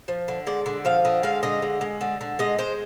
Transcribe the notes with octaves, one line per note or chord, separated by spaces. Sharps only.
F3
D3
G#3 D5
D3
F3 F5
D3 D#5
G#3 F5
D3 D#5
G#3
G#3
D3
D3
G#3 D#5
G#3 C5